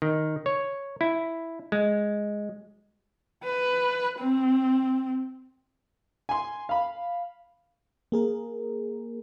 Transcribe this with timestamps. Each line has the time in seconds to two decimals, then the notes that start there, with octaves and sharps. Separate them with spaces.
0.02 D#3
0.46 C#5
1.01 E4
1.72 G#3
3.44 B4
4.19 C4
6.29 G#5 C6
6.69 F5 B5
8.12 A#3 G#4 A#4